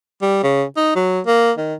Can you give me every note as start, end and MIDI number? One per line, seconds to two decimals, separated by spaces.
0.22 0.40 55
0.43 0.64 49
0.77 0.93 63
0.95 1.20 54
1.26 1.52 58
1.58 1.74 51